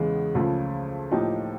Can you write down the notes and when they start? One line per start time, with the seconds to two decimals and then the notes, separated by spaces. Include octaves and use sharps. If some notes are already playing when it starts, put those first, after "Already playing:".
Already playing: E2 C#3 E3 G#3 B3
0.35 C#2 C#3 F3 A3
1.11 A2 F3 A#3 D#4 G4